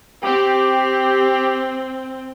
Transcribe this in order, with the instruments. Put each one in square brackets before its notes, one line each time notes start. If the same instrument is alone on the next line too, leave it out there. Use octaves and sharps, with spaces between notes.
[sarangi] C4 [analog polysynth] G4